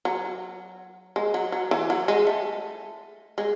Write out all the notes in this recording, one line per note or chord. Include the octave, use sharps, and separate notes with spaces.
F#3
G#3
F#3
F#3
E3
F#3
G#3
A3
G#3